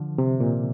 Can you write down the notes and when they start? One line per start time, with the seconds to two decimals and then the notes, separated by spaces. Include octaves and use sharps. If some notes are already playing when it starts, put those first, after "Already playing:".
Already playing: D3 F3
0.18 C3
0.40 A#2